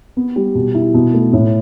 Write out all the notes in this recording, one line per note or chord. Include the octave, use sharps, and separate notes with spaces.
B3
G3
B2
E4
B2
A3
A2